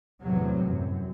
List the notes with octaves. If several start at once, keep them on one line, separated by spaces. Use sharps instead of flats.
E2 A2 C3 F#3
F#2